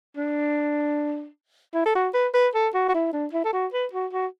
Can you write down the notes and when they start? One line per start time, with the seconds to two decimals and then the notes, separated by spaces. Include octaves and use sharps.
0.17 D4
1.74 E4
1.86 A4
1.95 F#4
2.14 B4
2.34 B4
2.54 A4
2.74 F#4
2.89 F#4
2.94 E4
3.13 D4
3.33 E4
3.44 A4
3.53 F#4
3.73 B4
3.93 F#4
4.12 F#4